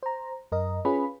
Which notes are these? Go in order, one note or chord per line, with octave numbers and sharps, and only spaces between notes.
C5 A#5
F#2 A#4 D#5
C#4 F4 G#4 B4 B5